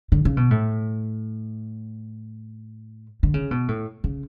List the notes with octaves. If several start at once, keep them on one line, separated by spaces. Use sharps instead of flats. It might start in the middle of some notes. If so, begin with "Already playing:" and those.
D3
C#3
B2
A2
D3
C#3
B2
A2
C#3